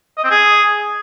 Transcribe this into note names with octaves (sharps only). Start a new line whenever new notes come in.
D#5
C4
G#4